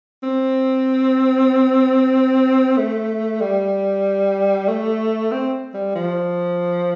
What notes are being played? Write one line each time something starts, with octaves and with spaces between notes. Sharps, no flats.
C4
A3
G3
A3
C4
G3
F3